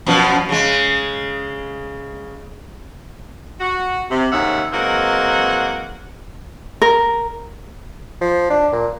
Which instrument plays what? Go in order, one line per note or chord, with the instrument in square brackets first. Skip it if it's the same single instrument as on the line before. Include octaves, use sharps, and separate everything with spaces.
[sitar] F#2 B2 F3
C#3 G#3
[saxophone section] F#4
C3
D#2 G#2 C#4 G#4 E5 F#5
E3 F#3 G#3 A#3 C4 F#5
[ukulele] A#4
[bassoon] F3
D4
A#2